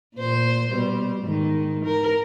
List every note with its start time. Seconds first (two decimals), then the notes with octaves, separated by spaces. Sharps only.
0.16 A#2 C5
0.71 B2 G3
1.25 G#2 D#3
1.85 A#4